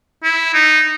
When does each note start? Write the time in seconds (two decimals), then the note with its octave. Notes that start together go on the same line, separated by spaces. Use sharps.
0.24 E4
0.54 D#4